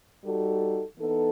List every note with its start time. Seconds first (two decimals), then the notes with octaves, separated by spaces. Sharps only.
0.24 G3 D#4 F#4 A4
0.97 E3 B3 D#4 A4